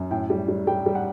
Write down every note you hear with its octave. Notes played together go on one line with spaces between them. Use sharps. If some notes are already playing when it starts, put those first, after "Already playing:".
Already playing: F#2
A2 G5
G3
G3
G3 G5
G3
F#5